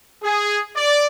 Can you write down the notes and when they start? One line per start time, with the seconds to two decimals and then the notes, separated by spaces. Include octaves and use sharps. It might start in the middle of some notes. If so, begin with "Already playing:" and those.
0.24 G#4
0.76 D5